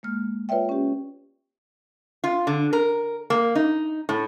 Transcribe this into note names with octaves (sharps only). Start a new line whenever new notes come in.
G#3 A#3 F6
F4 B4 C#5 D5 E5 G5
C#4 G4
F4
D3
A#4
A#3
D#4
A2